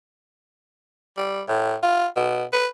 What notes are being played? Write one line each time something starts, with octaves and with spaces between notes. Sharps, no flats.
G3
A2
F4
B2
B4